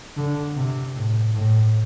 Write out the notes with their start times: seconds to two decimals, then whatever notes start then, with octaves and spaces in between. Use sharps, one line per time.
0.17 D3
0.56 C3
0.96 A2
1.35 A2